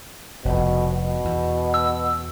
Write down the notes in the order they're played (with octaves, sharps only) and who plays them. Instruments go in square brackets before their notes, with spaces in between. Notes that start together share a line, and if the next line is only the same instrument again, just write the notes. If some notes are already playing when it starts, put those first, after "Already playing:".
[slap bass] F1 F2 [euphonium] B2
[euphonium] B2
[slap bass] E2
[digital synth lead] E6